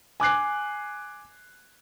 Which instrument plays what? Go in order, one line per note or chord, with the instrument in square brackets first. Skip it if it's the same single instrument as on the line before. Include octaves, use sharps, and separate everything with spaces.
[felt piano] G#5 D6 F#6 C7